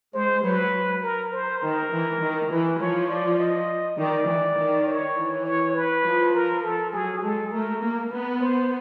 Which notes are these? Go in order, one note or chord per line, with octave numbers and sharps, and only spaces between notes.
G#3 C5
F#3 B4
A#4
C5
D#3 A#4
E3
D#3
E3 B4
F3 C#5
D5
D#5
D#3 D5
E3
D#3
C#5
E3
C#5
B4
F3
A#4
A4
F#3 G#4
G#3 A4
A3 A#4
A#3
B3 B4
C5